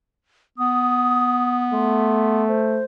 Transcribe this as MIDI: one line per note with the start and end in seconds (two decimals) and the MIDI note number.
0.58 2.52 59
0.58 1.62 87
1.73 2.82 57
1.73 2.44 84
2.48 2.84 72